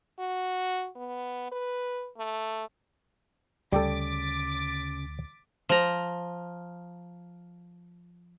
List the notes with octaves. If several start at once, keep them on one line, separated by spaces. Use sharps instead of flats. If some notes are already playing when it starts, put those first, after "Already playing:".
F#4
B3
B4
A3
D2 C#3 G3 G4 A4 D6 A6 B6
F3 A#5